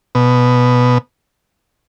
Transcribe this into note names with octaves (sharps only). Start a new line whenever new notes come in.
B2